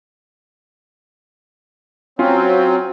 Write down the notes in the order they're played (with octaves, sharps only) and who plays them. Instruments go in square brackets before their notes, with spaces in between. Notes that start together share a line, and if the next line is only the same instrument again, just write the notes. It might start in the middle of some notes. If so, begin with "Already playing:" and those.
[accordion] F#3 C4 [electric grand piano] C#4 F4